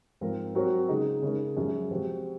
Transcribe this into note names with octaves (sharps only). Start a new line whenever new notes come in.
G#2 F3 C4 F4 A#4
F#3 C4 F#4 A#4 C#5
C#3 G#3 D#4
C#3 G#3 D#4 A#4
F#2 F3 G#3
C3 F3 G#3 C4 F#4